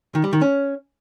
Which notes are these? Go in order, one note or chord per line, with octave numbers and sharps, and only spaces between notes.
D#3
G3
D#3
C#4